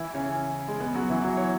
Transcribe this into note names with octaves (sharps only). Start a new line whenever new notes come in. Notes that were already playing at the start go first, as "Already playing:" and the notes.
Already playing: E3 E4
C#3 C#4
G#3
B3
F#3 F#4
E3 E4
F#3 F#4
C#5